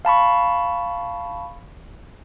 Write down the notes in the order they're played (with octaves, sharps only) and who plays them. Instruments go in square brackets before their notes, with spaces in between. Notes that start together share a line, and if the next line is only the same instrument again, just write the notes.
[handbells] F5 A5 B5 C#6